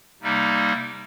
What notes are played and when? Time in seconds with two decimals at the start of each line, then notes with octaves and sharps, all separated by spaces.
0.22 C3 G3 A#3 D#4